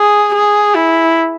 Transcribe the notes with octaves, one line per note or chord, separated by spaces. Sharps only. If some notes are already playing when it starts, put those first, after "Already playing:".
Already playing: G#4
G#4
E4